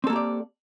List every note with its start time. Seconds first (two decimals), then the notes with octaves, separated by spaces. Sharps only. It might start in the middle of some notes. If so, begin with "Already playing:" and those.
0.04 C4
0.07 A4
0.10 A#3
0.13 G4
0.16 D5